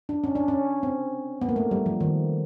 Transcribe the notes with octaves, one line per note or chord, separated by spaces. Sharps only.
D4
C#4
D4
C#4
C4
B3
A#3
A3
G3
F3
D#3